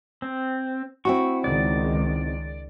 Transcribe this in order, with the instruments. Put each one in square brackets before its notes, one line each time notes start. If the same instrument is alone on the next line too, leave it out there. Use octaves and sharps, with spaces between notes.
[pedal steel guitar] C4
[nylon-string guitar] C4 E4 F#4 [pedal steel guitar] C#6
[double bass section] C#2 D#3 G#3 [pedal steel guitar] D5